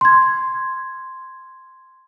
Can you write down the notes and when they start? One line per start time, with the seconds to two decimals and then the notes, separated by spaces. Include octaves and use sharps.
0.01 C6 G#6